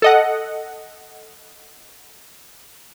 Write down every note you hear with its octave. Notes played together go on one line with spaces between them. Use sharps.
A4 D#5 F#5